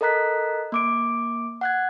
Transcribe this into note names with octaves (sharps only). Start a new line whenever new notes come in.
A4 A#4 D#5 A#5 F#6 B6
A#3 D6 D7
F#5 F#6 G#6